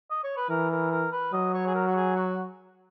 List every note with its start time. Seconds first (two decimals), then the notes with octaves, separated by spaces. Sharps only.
0.10 D#5
0.24 C#5
0.37 B4
0.50 E3 A#4
0.71 A#4
0.91 A#4
1.12 B4
1.33 F#3 D#5
1.54 C#5
1.67 G#4
1.74 A#4
1.87 F#4
1.96 G#4
2.16 F#4